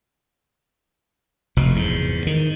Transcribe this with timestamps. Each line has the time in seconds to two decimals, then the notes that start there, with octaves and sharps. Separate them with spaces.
1.56 F1 B2
1.73 E2 G#2
2.27 D#3